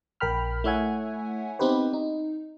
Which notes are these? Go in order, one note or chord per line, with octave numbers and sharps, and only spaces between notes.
A#1 A#4 G5 B5 F6
A3 E4 C#5 E5 F#5 G#5
B3 C4 D#4 G4 B4 C5
D#4